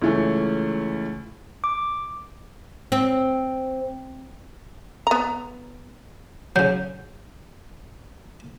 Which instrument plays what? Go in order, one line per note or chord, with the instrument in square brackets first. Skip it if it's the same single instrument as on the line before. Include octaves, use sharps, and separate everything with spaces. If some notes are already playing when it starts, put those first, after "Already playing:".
[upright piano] C#2 E3 A3 C#4
[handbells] D6
[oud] C4
[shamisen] B3 A#5
[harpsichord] C#3 F#3 [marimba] G6